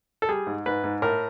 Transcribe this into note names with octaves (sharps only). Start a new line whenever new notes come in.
A4
G3 G#4
G#2
G#2 B4
G#2
A2 A#4